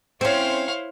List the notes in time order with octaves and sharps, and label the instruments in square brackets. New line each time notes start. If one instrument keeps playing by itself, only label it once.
[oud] C4 C#4 [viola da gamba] E4 C5 [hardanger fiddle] C#5 F5